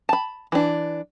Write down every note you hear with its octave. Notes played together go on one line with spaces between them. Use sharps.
A5 B5
E3 D4